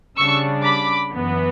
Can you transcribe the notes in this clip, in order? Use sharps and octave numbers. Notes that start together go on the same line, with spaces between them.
C#3 G3 D4 C#6 E6
B5 D6
F#2 E3 B3